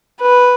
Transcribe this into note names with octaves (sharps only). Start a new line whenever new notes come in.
B4